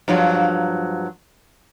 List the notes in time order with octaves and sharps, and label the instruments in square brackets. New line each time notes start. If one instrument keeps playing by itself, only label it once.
[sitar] G2 F3 F#3